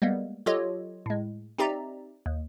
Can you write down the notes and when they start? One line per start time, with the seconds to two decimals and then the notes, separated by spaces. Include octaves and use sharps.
0.02 G3 G#3 A#3 B3
0.46 F#3 F4 G4 A4 C#5 D#5
1.06 A2 G#3
1.58 C4 D#4 G4 D5 E5 A#5
2.26 D#2